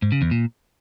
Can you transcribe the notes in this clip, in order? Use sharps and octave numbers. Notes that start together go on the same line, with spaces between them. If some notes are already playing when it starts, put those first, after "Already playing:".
G#2
C#3
E2
A#2